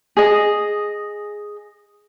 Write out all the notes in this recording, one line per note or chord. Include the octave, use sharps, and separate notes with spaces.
G#4 D#5